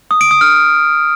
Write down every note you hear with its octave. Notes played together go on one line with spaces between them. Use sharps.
D#6
D7
D#6
F6